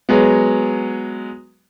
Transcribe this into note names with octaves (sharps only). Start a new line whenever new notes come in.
F#3 G#3 B3